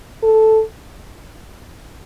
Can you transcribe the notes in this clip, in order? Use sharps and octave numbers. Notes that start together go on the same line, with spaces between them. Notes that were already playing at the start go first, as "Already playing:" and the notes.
A4